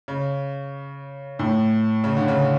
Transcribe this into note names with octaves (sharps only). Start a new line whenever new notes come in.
C#3
A2
C#3
D3
C#3